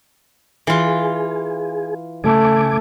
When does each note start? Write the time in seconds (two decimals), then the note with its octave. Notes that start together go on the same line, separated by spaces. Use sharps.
0.67 E3 F4 G#4
2.24 C#3 A3 G#5 D6